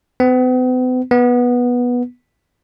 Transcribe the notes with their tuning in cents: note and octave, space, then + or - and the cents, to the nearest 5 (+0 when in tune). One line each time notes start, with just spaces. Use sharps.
B3 +45
B3 -10